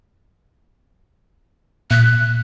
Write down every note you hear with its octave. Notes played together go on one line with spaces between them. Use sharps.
A#2 F#6 B6